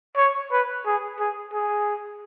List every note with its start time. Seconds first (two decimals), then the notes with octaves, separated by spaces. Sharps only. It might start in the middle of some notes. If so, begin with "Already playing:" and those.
0.17 C#5
0.52 B4
0.86 G#4
1.20 G#4
1.54 G#4